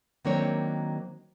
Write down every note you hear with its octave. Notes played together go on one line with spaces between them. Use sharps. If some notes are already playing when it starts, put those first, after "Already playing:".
D#3 F#3 A#3 C4 D4 C#5